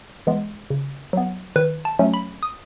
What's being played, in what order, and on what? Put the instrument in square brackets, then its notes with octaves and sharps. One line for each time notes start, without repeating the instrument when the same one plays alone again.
[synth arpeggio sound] E3 G#3 B3
C#3
F#3 B3
D#3 B4
A5
F#3 A3 C#4
B5
D#6